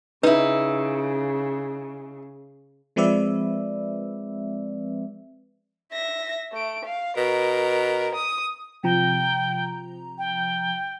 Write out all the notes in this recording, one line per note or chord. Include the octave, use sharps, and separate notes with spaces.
C#3 D#4 E4 B4
F3 G#3 C4 B4 D5 E5
E5 A#6
A3 D7
F5
B2 A#4
D#6
C3 F3 G5 A#5
G5